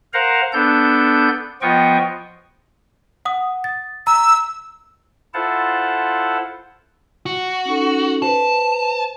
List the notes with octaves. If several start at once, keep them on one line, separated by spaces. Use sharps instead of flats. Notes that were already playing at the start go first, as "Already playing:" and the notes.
A#4 C5 F5 F#5 A#5
B3 D4 A4 G6
F3 B3 F4 D#5 G5 C#6
F#5 D#6
A6
A#5 E6
E4 F4 A4 C5 F#5 A5
F#4
C#4 D#4 A4
B4 C5 A5